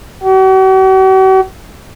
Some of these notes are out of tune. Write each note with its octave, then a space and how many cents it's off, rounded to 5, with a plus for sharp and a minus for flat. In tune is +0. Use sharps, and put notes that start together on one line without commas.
F#4 +45